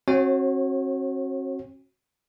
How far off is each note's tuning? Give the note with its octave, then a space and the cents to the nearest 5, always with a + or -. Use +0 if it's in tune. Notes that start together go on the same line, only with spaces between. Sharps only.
C4 +45 F#4 +0 C#5 -35